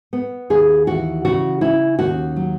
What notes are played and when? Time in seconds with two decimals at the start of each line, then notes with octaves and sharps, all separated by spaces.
0.13 B3
0.50 D#2 G#4
0.87 E3 F#4
1.25 C#3 F#4
1.61 C#4 E4
1.99 D#2 F#4
2.36 F#3